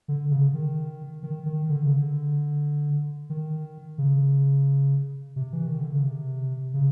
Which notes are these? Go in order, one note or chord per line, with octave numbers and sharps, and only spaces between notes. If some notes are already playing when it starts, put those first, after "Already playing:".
D3
C#3
D#3
D#3
D#3
D3
C#3
D3
D#3
C#3
C3
E3
D#3
D3
C#3
C3
C#3